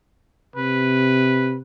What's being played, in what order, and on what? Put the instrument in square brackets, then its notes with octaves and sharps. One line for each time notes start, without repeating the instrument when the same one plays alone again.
[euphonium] C3 [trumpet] B4